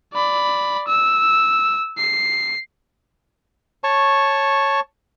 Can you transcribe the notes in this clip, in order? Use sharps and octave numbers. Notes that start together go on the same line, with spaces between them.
D5 B5
E6
C7
C#5 A5 C#6